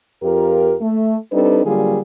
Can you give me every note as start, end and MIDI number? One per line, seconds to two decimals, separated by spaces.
0.22 0.74 41
0.22 0.74 65
0.22 0.74 67
0.22 0.74 70
0.81 1.15 57
1.32 1.64 55
1.32 1.64 60
1.32 1.64 62
1.32 1.64 63
1.32 1.64 69
1.32 1.64 71
1.65 1.99 50
1.65 1.99 54
1.65 1.99 55
1.65 1.99 58
1.65 1.99 65
1.65 1.99 68